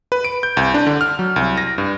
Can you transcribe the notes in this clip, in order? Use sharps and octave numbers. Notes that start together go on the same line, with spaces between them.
B4
D7
G6
C2
D4
D3
F6
F#3
C2
A#6
G2